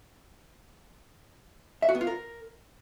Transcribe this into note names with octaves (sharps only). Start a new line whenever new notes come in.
E5
F#4
B3
F4
A#4